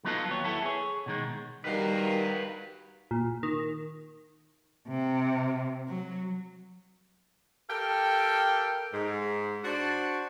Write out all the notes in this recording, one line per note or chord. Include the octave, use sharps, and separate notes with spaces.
F#3 B3 D#4 F4 A4
D#2 F#3 C#5
B3 E4 A4
G#4 C#5
B2 D#3 G#3
D#3 G3 F#4 A#4 B4 F5
A#2
D#3
C3
F#3
G4 A4 A#4 F5 G5
G#2
D4 F#4 C5